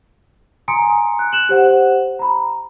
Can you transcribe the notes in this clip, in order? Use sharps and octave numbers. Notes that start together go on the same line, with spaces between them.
G#5 A#5 C6 D#6 C#7 D7
F#6
F#6 E7 F#7
G4 C5 F#5
A#5 B5